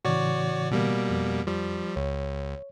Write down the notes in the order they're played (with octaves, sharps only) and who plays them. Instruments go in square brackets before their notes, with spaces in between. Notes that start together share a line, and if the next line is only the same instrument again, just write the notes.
[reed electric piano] A2 C#3 E3 [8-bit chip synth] F#4 C#5 D5
[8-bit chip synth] B2 G3 A#3
[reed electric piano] F2
[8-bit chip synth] F3 G3
[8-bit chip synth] C#2 [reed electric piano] C#5